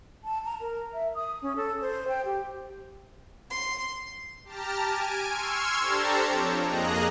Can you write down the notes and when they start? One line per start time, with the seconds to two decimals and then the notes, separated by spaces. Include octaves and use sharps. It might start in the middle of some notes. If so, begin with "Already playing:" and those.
0.24 A5
0.45 A#5
0.61 A#4
0.93 E5
1.15 D#6
1.42 C#4
1.56 A4
1.81 C5
2.08 G5
2.25 G4
3.50 C6
4.45 G4 A5 A#5 F6
4.85 G#5 D7
5.26 C6 C#6 E6 F6 G#6
5.79 D4 G4 A4 C5 A5 A#5
6.29 F3 C4 C#5 G5
6.62 F2 A#3 G#4 D#5 A#5 F#6